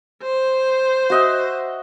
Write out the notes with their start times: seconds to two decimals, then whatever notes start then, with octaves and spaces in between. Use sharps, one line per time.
0.23 C5
1.10 F#4 D#5 E5